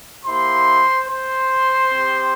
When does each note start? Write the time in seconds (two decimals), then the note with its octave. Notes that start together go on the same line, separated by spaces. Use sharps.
0.25 A#3 E4 G4 C5 C6
1.08 C5 C6
1.91 C4 G4